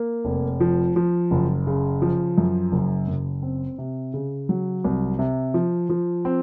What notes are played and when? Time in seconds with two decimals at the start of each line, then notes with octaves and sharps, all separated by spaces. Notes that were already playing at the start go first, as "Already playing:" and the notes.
Already playing: A#3
0.25 F1
0.60 F3
0.96 F3
1.31 F#1
1.67 C#3
2.02 F3
2.38 F#2
2.72 F#1
3.08 F#1
3.42 C4
3.78 C3
4.14 C#3
4.49 F#3
4.84 C2
5.19 C3
5.54 F3
5.89 F3
6.25 C4